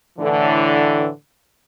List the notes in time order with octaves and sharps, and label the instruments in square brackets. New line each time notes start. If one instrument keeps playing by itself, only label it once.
[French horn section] A2 D3 E3